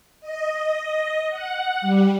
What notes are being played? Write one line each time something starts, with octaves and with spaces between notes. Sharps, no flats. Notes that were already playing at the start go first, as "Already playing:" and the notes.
D#5
F#5
G3